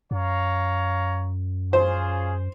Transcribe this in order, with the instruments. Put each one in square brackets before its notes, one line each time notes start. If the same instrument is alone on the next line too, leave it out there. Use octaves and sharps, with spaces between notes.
[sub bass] F#2 [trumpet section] C#5 F5 A#5
[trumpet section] C#4 F4 G#4 [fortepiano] C5